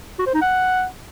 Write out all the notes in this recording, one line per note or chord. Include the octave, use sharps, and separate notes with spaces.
F#4
C5
D#4
F#5